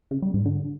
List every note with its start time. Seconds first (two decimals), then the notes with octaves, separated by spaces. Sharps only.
0.11 C#3
0.22 G3
0.34 G#2
0.45 D3